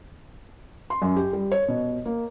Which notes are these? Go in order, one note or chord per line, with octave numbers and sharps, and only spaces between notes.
C6
F#2
G4
G3
C#5
B2
A#3